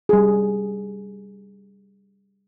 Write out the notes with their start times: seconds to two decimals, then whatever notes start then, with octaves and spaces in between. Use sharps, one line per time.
0.09 G3 G#4